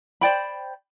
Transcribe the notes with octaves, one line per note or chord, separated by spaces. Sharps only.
C5 D5 G5 B5